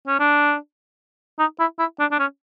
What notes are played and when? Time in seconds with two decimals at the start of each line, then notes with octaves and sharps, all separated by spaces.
0.08 C#4
0.20 D4
1.39 D#4
1.60 E4
1.79 E4
2.00 D4
2.11 D4
2.19 C#4